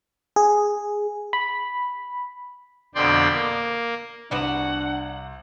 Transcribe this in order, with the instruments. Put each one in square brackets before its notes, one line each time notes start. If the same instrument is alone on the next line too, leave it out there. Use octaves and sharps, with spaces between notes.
[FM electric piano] G#4
B5
[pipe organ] F2 B2 D3 D5 G5 C6
A#3
[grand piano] C2 C5 E7 [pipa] G3 B3 F#4 [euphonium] D4 [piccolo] F#5